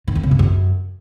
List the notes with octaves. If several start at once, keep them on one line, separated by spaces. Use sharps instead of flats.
D#3
F2
C#3
A2
F#2